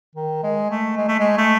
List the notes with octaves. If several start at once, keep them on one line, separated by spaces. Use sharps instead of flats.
D#3
G#3
A3
G#3
A3
G#3
A3